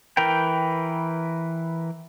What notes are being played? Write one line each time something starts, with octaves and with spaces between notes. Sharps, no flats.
E3 A#4 B4 G5